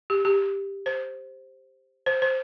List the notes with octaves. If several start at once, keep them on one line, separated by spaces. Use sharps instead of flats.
G4
G4
C5
C5
C5